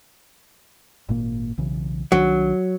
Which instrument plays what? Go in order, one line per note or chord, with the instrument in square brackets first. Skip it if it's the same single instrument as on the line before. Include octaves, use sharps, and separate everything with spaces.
[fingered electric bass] G#1 A#2 A#3
B1 C#3 E3
[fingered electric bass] C2 D#3 D4 [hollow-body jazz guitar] F#3